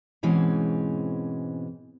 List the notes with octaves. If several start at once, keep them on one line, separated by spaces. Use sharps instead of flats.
G#2 B2 E3 G#3 C4 C#4